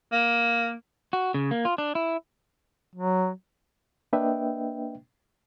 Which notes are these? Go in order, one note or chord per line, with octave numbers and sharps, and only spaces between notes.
A#3
F#4
C#3
A#3
F4
D4
E4
F#3
A#3 D4 B4 D#5 E5 G5